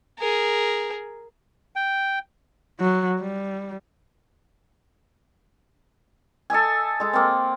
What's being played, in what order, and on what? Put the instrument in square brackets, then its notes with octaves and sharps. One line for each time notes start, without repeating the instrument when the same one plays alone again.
[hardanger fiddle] G#4 A#4
[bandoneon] G5
[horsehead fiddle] F#3
G3
[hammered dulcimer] A4 D#5 E5 G#5
G#3 A4
A#3 C4